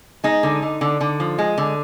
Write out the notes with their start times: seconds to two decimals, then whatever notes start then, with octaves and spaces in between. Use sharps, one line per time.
0.24 G#3 D#4
0.43 D3
0.62 D3
0.81 D3
1.00 D3
1.20 F3
1.38 G#3
1.58 D3